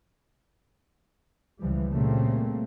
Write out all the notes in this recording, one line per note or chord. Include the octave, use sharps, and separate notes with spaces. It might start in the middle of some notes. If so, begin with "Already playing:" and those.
C#2 E3 F3 G3
A#2 C#3 G3 A3 A#3 C4